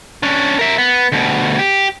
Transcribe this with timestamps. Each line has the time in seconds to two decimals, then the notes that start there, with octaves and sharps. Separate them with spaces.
0.23 C#4 D4
0.59 A#4 E5
0.78 B3
1.12 D2 B2
1.59 G4